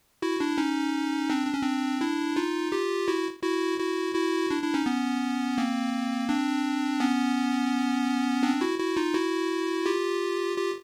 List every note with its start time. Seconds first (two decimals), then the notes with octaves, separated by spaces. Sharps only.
0.22 E4 F#4
0.40 D4 E4
0.58 C#4 D#4
1.30 C4 D4
1.47 D4
1.55 C#4
1.62 C4 D4
2.01 D4 E4
2.36 D#4 F4
2.72 F4 G4
3.08 E4 F#4
3.43 E4 F#4
3.79 E4 F#4
4.15 E4 F#4
4.50 D4 E4
4.62 D4 E4
4.74 C#4 D#4
4.86 B3 C#4
5.58 A#3 C4
6.29 C4 D4
7.00 B3 C#4
8.43 C4 D4
8.61 E4 F#4
8.79 E4 F#4
8.97 D#4 F4
9.15 E4 F#4
9.86 F4 G4
10.57 F4 G4